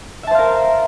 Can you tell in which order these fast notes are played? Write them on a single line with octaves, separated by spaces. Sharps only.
E5 A5 C5 F5 A#4